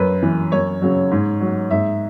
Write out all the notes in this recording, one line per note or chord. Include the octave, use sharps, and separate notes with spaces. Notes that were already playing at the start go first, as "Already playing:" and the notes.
Already playing: F#2 B4
E3
F#2 C#5
C#3 F#3
G#2
F#3
G#2 E5